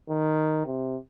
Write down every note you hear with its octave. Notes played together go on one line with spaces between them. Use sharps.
D#3
C3